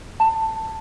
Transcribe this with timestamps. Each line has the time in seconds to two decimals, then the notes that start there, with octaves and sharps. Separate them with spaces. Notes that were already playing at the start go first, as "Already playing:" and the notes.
0.20 A5